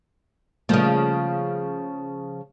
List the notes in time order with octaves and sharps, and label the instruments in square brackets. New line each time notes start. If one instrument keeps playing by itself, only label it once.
[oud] C#3 F3 [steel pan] G3 A3 A#3